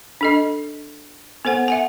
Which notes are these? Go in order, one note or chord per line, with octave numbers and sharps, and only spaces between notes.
D4 A4 D#5
B3 A4 C5 F#5
E5 F#5 G#5